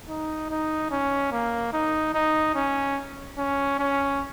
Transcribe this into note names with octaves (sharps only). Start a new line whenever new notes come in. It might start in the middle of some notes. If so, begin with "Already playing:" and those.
D#4
D#4
C#4
A#3
D#4
D#4
C#4
C#4
C#4